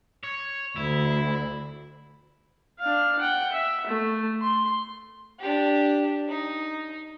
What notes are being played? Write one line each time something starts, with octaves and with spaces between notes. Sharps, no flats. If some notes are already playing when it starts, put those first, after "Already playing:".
C#5
D2 E4
D4 F5
F#5 G5
E5
A3
C6
D4 G4
D#4